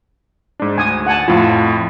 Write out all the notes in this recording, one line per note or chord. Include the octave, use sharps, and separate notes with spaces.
G#2 D4
D2 G#5 D#6
F#5 G#5 A5
F2 A2 F4